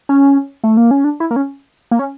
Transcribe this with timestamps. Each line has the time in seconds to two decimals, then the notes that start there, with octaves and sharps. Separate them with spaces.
0.09 C#4
0.64 A3
0.77 A#3
0.91 C#4
1.04 D4
1.20 E4
1.31 A#3
1.36 C#4
1.91 A#3
1.99 C#4